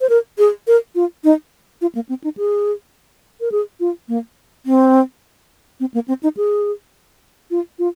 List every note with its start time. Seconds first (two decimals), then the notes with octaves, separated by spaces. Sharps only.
0.01 C5
0.09 A#4
0.38 G#4
0.67 A#4
0.95 F4
1.24 D#4
1.81 F4
1.95 A#3
2.09 C4
2.24 D#4
2.37 G#4
3.41 A#4
3.52 G#4
3.80 F4
4.09 A#3
4.66 C4
5.80 C4
5.94 A#3
6.08 C4
6.23 D#4
6.37 G#4
7.51 F4
7.79 F4